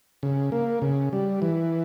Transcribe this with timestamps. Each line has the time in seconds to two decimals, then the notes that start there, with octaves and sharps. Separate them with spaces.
0.23 C#3
0.52 A#3
0.82 C#3
1.13 G3
1.42 E3